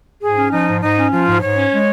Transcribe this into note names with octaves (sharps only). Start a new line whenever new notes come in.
G#2 G#4
C#4
F3 D#4
G#2
G#2 D#4
C#4
F3 F4
G#2
G#2 C#5
C#4
G#3